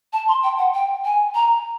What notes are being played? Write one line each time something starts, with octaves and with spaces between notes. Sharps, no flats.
A5
C6
G5
F#5
G5
G#5
A#5